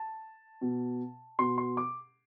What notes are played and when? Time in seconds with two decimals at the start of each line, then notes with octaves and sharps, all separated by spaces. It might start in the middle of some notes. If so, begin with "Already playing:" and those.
Already playing: A5
0.61 B2
1.39 B2 C6
1.58 C6
1.77 D6